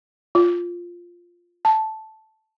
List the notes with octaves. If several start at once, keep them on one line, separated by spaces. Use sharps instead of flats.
F4
A5